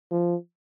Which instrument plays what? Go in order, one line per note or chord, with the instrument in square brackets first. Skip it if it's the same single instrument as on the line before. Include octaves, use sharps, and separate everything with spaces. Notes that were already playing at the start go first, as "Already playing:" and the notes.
[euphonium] F3